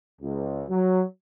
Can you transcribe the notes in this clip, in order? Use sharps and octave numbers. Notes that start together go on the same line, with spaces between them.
C#2
F#3